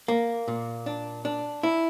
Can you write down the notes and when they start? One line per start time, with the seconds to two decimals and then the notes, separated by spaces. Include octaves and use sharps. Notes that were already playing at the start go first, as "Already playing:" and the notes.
0.08 A#3
0.48 A#2
0.86 D4
1.25 D4
1.63 E4